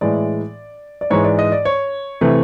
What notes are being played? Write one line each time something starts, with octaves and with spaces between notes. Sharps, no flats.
A2 E3 G#3 D5
D5
G#2 E3 G#3 C#5
D5
D#5
D5
C#5
C3 E3 A3